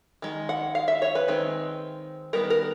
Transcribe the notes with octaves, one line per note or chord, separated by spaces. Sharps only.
D#3 G#3
F#5
F5
E5
C#5
B4
D#3 G#3 C4
D#3 G3 B3 A#4
A#4